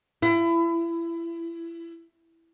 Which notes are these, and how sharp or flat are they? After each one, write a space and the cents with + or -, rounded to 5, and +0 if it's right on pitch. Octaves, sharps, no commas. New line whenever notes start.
E4 +25